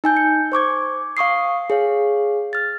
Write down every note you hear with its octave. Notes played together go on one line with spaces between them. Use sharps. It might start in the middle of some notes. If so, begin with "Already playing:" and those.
D#4 G#5 G6
C#7
C5 C#6 D6 G#6
F5 C#6 D#6 C7
G#4 C#5 F5
F6 A6